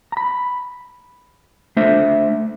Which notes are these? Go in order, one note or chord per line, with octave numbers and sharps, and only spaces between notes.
A#5 B5
A3 D4 C5 E5